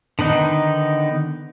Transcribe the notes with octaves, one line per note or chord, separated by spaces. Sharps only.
D3 D#3 B3 D#4